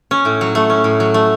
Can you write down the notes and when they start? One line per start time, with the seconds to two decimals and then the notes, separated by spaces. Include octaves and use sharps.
0.11 C#4
0.25 A2
0.41 F#3
0.55 A3
0.70 C#4
0.84 A2
1.00 F#3
1.14 A3